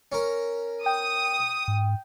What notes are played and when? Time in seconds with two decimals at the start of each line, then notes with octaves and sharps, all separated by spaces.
0.12 C#4 A#4
0.86 G5 D#6
1.68 G#2